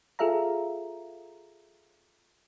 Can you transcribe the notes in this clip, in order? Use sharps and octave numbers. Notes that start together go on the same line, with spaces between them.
F4 G#4 A4 E5 F5 A#5